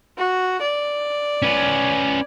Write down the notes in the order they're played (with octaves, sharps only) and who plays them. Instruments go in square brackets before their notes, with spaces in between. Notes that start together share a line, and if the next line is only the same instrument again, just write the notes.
[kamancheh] F#4
D5
[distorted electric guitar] C#4 B4